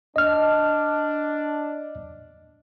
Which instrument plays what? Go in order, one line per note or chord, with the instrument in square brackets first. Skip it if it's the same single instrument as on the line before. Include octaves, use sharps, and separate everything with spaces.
[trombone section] D4 [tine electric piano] D#5 F6